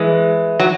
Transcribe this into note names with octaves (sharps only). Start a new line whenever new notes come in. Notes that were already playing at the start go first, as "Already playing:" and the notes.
Already playing: E3 G#3
F#3